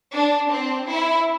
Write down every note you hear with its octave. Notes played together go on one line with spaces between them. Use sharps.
D4
C4
E4